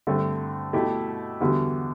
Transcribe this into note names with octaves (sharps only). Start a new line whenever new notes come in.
G2 D3 A3 C4
B2 A3 E4 G4
E2 D3 G3 B3 F#4